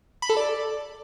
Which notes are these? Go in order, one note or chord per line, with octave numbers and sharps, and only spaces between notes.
B5
A4
D5